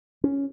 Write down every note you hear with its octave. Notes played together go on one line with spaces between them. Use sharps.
C#4